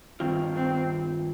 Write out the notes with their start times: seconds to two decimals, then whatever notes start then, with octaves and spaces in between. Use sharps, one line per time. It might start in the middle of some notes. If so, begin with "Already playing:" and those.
0.20 G2 D#3 C4 F4
0.55 C4